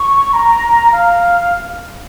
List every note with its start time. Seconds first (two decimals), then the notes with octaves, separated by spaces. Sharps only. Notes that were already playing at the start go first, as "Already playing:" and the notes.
Already playing: C#6
0.33 A#5
0.92 F5